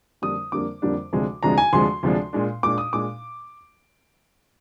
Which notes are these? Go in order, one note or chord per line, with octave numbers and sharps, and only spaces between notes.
F2 D3 G3 A#3 D4 D#6
F2 D3 G3 A#3 D4 D6
F2 D3 G3 A#3 D4
D2 C3 F3 G#3 D4
D2 C3 F3 G#3 D4 A#5
G#5
D2 C3 F3 G#3 D4 C6
D2 C3 F3 G#3 D4
A#2 G#3 D4
A#2 G#3 D4 D6
D#6
A#2 G#3 D4 D6